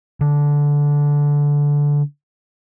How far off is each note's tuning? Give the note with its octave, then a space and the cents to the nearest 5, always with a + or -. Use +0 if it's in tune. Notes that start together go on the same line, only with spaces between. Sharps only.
D3 -15